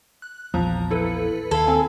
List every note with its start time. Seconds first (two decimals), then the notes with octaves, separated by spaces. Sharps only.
0.22 F#6
0.54 A#1 E2 F3 A#5
0.91 E4 A4 B4
1.51 D#2 A4 F5 B5 G#6
1.68 C4 G#5